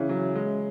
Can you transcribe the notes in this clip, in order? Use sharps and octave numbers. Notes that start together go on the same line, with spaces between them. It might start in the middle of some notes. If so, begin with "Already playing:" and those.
Already playing: C#3 E3 C#4 G#4 C#5 E5
F#3
G#3